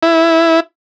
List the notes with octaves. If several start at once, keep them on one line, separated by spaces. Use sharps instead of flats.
E4